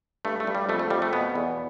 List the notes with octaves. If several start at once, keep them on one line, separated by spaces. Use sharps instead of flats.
G2 A3
A3
G2
G3
F2 A3
A3
F2 G3
A3
B2 B3
E2